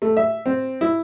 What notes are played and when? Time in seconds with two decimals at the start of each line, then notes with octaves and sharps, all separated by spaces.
0.02 A3
0.17 E5
0.46 C4
0.81 E4